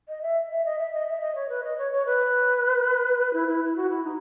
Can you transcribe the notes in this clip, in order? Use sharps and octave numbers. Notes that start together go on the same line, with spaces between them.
D#5
E5
E5
D#5
E5
D#5
E5
D#5
C#5
B4
D#5
C#5
C#5
B4
E4
E4
E4
F#4
E4
D#4